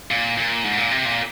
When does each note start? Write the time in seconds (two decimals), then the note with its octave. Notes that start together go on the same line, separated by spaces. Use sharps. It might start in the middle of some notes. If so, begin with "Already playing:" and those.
0.11 A#2
0.38 A#2
0.64 G#2
0.77 A#2
0.91 C3
1.05 A#2